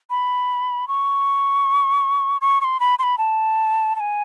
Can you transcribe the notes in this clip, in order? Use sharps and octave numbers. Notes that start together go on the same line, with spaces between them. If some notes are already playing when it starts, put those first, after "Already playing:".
B5
C#6
C#6
C#6
C6
B5
C6
B5
A5
A5
G#5